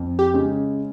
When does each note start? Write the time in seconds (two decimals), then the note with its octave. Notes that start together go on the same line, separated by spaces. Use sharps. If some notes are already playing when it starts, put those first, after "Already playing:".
Already playing: F2
0.19 G4
0.34 C#3 G#3 C#4